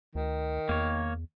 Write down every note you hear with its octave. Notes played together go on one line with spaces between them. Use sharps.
D2 D#3
E2 A#3 C#5